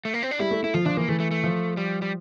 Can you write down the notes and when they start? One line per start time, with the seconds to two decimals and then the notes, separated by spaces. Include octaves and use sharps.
0.05 A3
0.14 A#3
0.23 C4
0.31 D4
0.40 G3 E4
0.51 A3
0.63 A3 E4
0.74 F3 F4
0.85 F3 D4
0.97 E3 A#3
1.09 E3 A3
1.20 A3
1.31 A3
1.44 F3
1.77 G3
2.02 G3